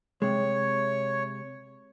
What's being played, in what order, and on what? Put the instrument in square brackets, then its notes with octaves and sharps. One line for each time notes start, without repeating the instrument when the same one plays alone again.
[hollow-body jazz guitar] C3 G#3 [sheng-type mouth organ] C#5